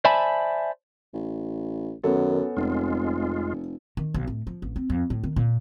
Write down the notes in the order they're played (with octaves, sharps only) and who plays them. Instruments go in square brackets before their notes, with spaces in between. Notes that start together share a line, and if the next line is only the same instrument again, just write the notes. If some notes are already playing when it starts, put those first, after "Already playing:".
[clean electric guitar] C5 D5 E5 G#5 A5 B5
[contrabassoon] A1
[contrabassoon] F#2 [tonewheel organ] D#3 [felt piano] B3 C#4 A4
[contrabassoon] F1 [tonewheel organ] F2 G#3 F4
[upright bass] D#3
B1
A2
F3
A1
C4
F2
A2
D#3
A#2